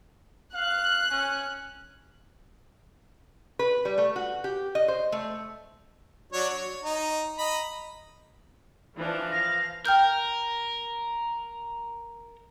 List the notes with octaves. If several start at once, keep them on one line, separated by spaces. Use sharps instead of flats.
F5 F#6
C#4
B4
G3
A3
F#4
G4
D#5
C5
A3
F#3 D4 C#5
C#5
D#4
D#5 A#5 B5
E3 F3 D4
F5 A#6
A#4 G5 F6 G6